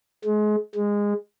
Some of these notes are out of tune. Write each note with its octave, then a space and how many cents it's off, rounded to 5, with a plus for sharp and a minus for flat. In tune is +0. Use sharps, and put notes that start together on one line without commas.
G#3 +30
G#3 -15